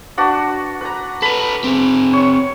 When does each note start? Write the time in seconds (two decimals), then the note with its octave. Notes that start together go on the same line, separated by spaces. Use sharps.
0.18 D4 F#4 B4
0.81 B4 A#5
1.22 A4 B4 B5
1.64 C4 G#4
2.13 C#5 C#6